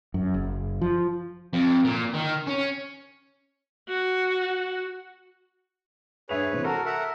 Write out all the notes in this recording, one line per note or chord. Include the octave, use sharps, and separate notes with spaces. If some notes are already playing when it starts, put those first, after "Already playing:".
F#2
F#1
F3
F2
A#2
D#3
C#4
F#4
G2 G#4 B4 C#5 E5 F7
C3 E3 C5
F#4 A4 A#4 A#5
A#4 E5 F#5